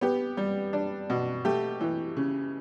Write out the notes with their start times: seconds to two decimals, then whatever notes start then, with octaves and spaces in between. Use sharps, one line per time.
0.01 B3 G4
0.37 G3
0.73 D4
1.10 B2
1.45 A3 G4
1.80 E3
2.16 C#3